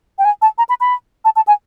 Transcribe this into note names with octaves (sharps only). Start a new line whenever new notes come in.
G5
G#5
A5
A#5
B5
B5
A5
A5
G#5